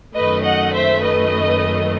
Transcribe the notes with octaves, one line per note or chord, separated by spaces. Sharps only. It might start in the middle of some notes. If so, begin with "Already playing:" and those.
F#2 D#3 A3 B4 D#5
D#5 F#5
C5 E5
B4 D#5